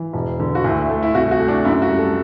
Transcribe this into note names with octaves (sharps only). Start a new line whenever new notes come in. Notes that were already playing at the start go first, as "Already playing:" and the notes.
Already playing: E3
E1
D3
F#4
D2 E4
A3
E4
C2 F#4
F#4
A3
D4
F#2 E4
F#4
G3
A4